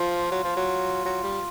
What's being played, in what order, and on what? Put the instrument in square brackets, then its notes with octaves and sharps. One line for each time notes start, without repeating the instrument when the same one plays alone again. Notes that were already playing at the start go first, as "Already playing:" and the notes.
Already playing: [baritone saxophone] F3 [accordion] F4
[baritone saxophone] F#3
F3
F#3
F#3
G3